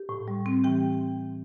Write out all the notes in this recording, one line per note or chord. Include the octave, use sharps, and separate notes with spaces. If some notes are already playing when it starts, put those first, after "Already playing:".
Already playing: G4
A2
G3
C4
E3 G4 G5